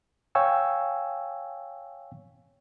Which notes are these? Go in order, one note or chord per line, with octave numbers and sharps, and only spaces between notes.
C#5 F5 G5 G#5 C#6 E6